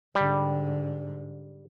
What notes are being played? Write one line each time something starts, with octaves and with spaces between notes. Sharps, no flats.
G#2 D3 G3